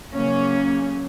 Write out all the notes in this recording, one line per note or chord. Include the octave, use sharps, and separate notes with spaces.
C#3 F#3 A#3 C#4